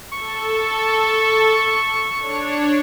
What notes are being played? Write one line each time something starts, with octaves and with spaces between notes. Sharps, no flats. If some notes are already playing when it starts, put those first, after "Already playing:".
A4 C#6
D4 C#5